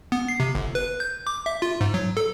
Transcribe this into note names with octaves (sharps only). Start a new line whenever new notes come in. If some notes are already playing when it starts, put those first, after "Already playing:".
B3
C7
C3
G1
B4
G6
D6
E5
F4
G#2
F#3
A4